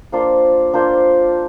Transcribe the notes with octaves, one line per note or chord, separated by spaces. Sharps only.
A#3 D4 F4 C5
A#3 D4 F4 C5